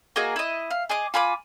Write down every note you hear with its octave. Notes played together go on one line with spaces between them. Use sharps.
A#3 F#4 G#4 D#5
E4 D#5
F5
G#4 D#5 D6
F4 G#5 B5 D6